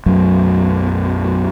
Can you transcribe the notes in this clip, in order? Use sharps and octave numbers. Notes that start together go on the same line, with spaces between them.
B1 F#2 F#3 A3